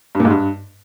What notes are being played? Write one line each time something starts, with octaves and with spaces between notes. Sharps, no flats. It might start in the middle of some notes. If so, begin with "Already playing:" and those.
G2
A#2
G#2
G2